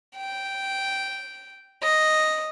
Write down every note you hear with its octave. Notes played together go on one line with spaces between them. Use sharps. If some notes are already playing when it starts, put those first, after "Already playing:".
G5
D#5